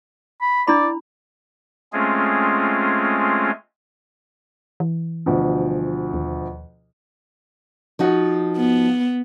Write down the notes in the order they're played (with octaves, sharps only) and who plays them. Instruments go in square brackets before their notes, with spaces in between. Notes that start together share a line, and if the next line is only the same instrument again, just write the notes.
[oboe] B5
[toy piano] D4 E4 B5 [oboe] D5
[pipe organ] G#3 A3 C4 C#4 F4 G#4
[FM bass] E3
[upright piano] D2 B2 F3
[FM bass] D#2
[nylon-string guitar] F3 D#4 F#4
[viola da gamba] B3